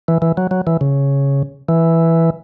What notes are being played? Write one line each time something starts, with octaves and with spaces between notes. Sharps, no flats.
E3
E3
F#3
F#3
E3
C#3
E3